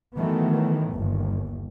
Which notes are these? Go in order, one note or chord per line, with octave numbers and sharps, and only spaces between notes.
D#3 E3 F#3 A3 B3
G1 D#2